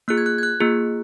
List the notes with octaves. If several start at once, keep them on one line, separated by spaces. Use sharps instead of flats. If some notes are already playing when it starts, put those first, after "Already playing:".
A#3 F4 G#4 F#6
G#6
F#6
G#6
F#6
A#3 F4 G#4